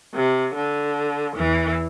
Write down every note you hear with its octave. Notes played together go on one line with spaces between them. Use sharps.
C3
D3
E2 E3